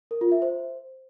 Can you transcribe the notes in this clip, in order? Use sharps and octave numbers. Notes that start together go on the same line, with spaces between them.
A#4
F4
E5
C5